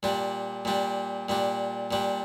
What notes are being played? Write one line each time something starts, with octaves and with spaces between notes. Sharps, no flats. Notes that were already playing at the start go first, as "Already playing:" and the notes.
A#2 G3 D4
A#2 G3 D4
A#2 G3 D4
A#2 G3 D4